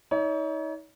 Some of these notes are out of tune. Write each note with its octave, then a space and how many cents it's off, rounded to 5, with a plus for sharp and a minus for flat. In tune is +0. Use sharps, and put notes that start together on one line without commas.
D#4 +35 C#5 +40